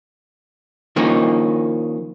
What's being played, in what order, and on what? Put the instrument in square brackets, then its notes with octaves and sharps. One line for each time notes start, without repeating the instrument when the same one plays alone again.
[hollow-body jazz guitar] D#3 F3 A#3 C#4 D#4